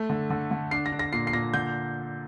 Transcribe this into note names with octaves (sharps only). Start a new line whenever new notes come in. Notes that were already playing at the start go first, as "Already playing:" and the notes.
Already playing: A3
D3
D3
D3
D4 C7
A#6
D4
A#6
A#2 C7
C7
A#2 A#6
D3 G6